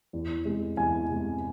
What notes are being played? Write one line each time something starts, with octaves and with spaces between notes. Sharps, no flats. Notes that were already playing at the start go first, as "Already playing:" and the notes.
E2
C3 G#3
E2 G#5
C3 G#3